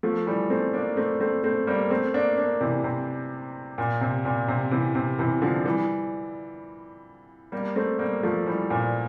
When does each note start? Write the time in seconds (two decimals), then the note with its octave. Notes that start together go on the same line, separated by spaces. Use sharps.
0.03 F3 A3
0.26 E3 G3
0.50 A3 C4
0.74 A#3 D4
0.97 A3 C4
1.20 A3 C4
1.44 A3 C4
1.67 G3 A#3
1.90 A3 C4
2.14 A#3 D4
2.37 A#3 D4
2.61 C3 E3
2.84 C3
3.78 A#2
4.01 C3
4.25 A#2
4.48 C3
4.71 C3 E3
4.95 C3
5.19 C3 E3
5.42 D3 F3
5.65 E3 G3
7.52 G3 A#3
7.76 A3 C4
7.99 G3 A#3
8.23 F3 A3
8.46 E3 G3
8.70 A#2